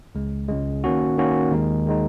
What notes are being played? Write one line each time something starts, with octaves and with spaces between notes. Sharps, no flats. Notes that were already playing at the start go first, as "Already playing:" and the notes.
C#2 C#3 G#3
C#2 C#3 G#3
D#3 A#3 C#4 F#4
D#3 A#3 C#4 F#4
D#2 D#3 G#3 D#4
D#3 G#3 D#4